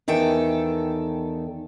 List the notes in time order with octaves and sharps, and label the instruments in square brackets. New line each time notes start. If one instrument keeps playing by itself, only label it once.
[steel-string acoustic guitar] E2 D#3 A4 G5